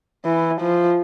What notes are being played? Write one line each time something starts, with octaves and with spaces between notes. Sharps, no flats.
E3
F3